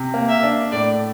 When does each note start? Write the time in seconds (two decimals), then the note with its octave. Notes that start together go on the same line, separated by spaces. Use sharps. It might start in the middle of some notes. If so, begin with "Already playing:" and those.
Already playing: C3
0.14 A#3
0.29 E5
0.43 D4
0.72 A2 D5